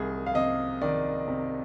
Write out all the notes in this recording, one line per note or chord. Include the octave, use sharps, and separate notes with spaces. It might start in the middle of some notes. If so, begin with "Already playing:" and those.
Already playing: C2 D#3 G#4
F5
C3 D#5
D#3 D5
C3